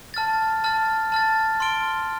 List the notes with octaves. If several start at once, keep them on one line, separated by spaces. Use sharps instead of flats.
A5 F6 A6
A5 F6 A6
A5 F6 A6
C6 F6 D7 G7